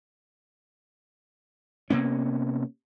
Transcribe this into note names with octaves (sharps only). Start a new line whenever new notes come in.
C3 A#3 B3 C#4